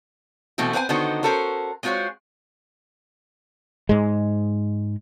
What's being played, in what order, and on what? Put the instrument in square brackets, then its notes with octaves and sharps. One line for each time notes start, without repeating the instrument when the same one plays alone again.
[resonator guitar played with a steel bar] B2 E3 A3 C4 E4 F#4
C4 B4 C5 F#5 G#5
D3 D#3 B3 D#4 F#4 C5
C#4 F#4 A4 A#4 C5
G#3 C4 F4 F#4 C5 C#5
[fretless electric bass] G#2 G#3